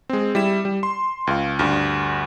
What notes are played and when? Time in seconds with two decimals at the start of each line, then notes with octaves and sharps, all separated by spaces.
0.09 G#3 C4
0.35 G3 E4 E7
0.65 G3
0.83 C6
1.27 C#2 F5
1.59 D2 G2